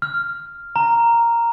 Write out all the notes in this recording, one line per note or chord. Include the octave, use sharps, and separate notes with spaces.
F6
A#5